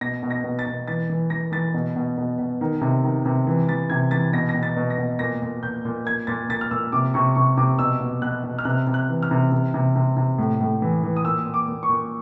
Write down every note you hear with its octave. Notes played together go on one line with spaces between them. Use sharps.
B2 A#6
B2
A#6
B2
A6
B2
E3 A6
E3
E3 A#6
E3 A6
B2
B2
B2
B2
D#3
C3
D#3
C3
E3
E3 A6
C3 G#6
E3 A6
B2 A#6
A#6
B2
A6
B2
A#6
B2
A#2 A#6
A#2
A#2 G6
A#2
A#2 G#6
A#2 A6
A#2 A6
F6
A#2 E6
C3 D6
C3 C#6
C3 C#6
C3 D6
B2 E6
B2
B2 F#6
B2
F6
C3 F#6
C3
F#6
E3
F6
C3
C3
C3
C3
C3
A2
A2
E3
E3
D#6
A#2 E6
A#2
D6
A#2
C#6
A#2